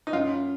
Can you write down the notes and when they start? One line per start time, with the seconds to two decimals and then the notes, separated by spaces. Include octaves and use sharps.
0.07 D#4
0.13 F#2 F4